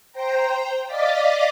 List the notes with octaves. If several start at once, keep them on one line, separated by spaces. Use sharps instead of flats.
C5 G5 A#5
D5 D#5 F5 D6 A6 B6